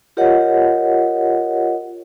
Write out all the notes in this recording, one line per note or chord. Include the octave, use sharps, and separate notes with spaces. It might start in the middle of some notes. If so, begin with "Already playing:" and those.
F4 G4 A#4 C#5 D#5 F#5